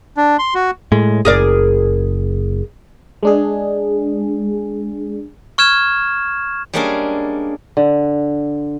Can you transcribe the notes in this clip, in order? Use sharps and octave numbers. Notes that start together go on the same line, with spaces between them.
D4
C6
F#4
A2 G#3
F#1 G#4 A#4 D5
G#3 D4 G#4
C#6 F6 G#6 E7
G3 G#3 A#3 C#4 D4 G#4
D3